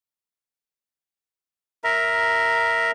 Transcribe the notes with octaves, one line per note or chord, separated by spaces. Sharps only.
A#4 E5 A#5